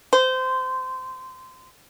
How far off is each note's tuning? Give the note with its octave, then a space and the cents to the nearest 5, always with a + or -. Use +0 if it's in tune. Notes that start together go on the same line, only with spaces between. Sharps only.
C5 -20